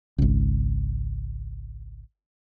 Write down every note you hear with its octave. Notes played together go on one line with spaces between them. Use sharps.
G#1 C#2